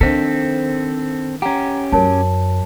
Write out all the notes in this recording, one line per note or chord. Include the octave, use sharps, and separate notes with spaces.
D#3 C4 D4 A4 C5 B6
C#4 G4 F#5 A#5
F#2 A#4 C#5 A5